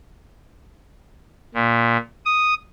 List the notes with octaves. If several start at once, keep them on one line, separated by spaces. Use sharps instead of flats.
A#2
D#6